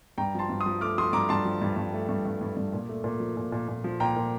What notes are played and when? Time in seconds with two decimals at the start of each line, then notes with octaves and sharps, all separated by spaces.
0.18 G2 G5 A#5
0.35 F3 A5 C6
0.49 G2
0.61 C6 D#6
0.66 F3
0.81 A3 D6 F6
0.98 F3 C6 D#6
1.13 G2 A#5 D6
1.29 G2 A5 C6
1.45 F3
1.62 G2
1.77 G2
1.93 A3
2.09 G2
2.26 G2
2.41 G2
2.57 G2
2.73 A#2
2.89 A3
3.04 A#2
3.20 F3
3.37 A#2
3.52 A#2
3.68 A#2
3.84 F3
4.00 A#2 G5 A#5
4.16 A#2